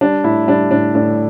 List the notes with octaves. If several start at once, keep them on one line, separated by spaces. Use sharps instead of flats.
G3 D4
A2 E4
G3 D4
A2 D4
A2 D4